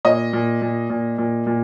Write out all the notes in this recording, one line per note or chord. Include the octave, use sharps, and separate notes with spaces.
A#2 D#5
A#2
A#2
A#2
A#2
A#2